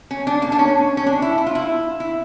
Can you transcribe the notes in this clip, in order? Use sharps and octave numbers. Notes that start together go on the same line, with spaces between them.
C#4
D4
A#3
D4
C#4
C#4
D4
E4
E4
F4
E4
E4